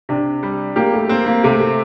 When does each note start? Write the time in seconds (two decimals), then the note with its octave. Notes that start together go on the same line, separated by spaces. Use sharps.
0.09 C3 D4
0.43 G3
0.76 A#3 G4
0.94 A3
1.09 A#3 C4
1.26 A#3
1.44 C3 A3
1.60 A3